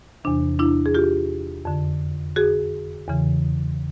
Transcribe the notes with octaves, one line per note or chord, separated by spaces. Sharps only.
E2 C3 E3 D4
D4 E4
G#4
F4 G4
F2 D3
F#4 G#4
E2 C#3 E3